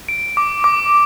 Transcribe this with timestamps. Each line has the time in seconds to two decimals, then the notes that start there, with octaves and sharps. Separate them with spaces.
0.09 D7
0.37 D6
0.64 D6